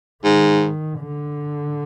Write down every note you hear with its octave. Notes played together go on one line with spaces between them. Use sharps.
G#2 D#3
D3